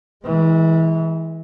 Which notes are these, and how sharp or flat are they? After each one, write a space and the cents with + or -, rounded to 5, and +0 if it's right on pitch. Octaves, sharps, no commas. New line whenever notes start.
E3 -25 G#3 +5